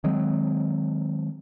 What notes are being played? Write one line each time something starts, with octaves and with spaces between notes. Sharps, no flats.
D#3 F#3 G#3 C4